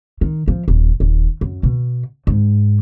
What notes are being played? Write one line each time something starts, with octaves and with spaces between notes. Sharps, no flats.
D#3
F3
D#1
D#1
F#2
B2
G#2